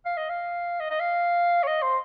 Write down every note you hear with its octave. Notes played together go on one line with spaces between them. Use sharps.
F5
D#5
F5
D#5
D#5
F5
C#5
D#5
C5